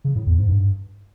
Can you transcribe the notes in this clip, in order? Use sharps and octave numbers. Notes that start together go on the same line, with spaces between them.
C#3
A2
E2
G#2
G2